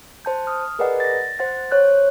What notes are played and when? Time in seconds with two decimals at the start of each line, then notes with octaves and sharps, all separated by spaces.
0.25 C5 A5 G6
0.47 D#6 F6
0.79 G#4 A#4 B4 D5 D#5 F#5
1.00 A6 A#6
1.39 C5 F#5 A6
1.71 C5 C#5 F#6 G6